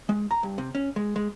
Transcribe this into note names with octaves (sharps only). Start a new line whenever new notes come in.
G#3
A#5
G2
C3
C#4
G#3
G#3